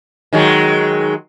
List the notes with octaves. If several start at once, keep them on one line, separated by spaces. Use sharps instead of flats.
D#3 F#3 G#3